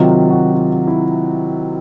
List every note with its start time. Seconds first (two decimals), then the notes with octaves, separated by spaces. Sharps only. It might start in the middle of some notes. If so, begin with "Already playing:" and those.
Already playing: C3 D#3 F#3 F4
0.30 F#4
0.53 F4
0.70 F#4
0.87 E4